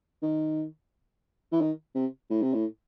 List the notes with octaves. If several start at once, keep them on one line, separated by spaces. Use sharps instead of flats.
D#3
E3
D#3
C3
A2
C3
A2